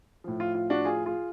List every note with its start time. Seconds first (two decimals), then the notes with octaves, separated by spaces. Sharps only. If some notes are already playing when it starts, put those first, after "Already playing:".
0.24 A2 F3
0.40 F4
0.55 F4
0.70 D4 F#4
0.85 F4 G#4
1.05 F4 G#4